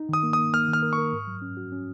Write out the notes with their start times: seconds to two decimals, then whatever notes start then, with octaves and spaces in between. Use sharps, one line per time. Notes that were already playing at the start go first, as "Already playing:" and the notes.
Already playing: D#4
0.09 D#3 D#6
0.23 A#3
0.33 D#6
0.38 A#3
0.53 A#3 F6
0.68 D#3
0.73 F6
0.83 A#4
0.93 C#6
0.98 A#4
1.12 G#2
1.27 F#3
1.42 C#4
1.57 F#4
1.72 C#4